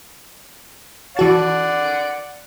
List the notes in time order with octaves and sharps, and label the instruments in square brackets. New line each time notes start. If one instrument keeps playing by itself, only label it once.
[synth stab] E3 F#4 A5 [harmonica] D5 F#5